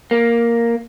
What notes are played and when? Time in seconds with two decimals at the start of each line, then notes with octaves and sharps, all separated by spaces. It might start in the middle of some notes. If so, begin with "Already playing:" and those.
0.11 A#3